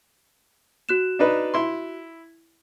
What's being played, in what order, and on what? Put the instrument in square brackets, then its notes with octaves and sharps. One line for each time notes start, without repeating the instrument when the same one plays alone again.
[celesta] F#4 F#6 E7
[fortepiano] D4 D#4 B4
E4 C6